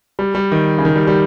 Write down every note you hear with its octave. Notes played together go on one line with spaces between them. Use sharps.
G3
G3
D#3
C#3
D#3
G3
G3